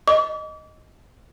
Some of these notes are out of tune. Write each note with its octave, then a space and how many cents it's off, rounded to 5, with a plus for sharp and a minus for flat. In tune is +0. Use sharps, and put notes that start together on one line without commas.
D#5 +0 D6 -35